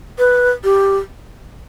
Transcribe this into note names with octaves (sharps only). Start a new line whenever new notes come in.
B4
G4